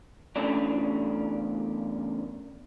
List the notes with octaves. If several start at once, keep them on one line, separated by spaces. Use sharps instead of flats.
E2 C#3 A3 C#4 D4